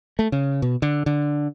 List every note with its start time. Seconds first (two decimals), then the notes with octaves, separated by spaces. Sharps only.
0.19 A3
0.32 C#3
0.62 B2
0.82 D3
1.06 D3